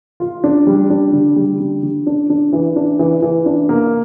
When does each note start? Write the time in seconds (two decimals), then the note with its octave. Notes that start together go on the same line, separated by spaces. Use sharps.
0.20 F4
0.44 D4
0.67 G3
0.90 D4
1.13 D3
1.36 G3
1.60 D3
1.83 D3
2.07 D4
2.30 D4
2.53 E3
2.76 D4
2.99 E3
3.22 E3
3.46 D4
3.69 A#3